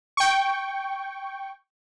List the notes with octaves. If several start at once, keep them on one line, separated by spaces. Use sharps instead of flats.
G5 C#6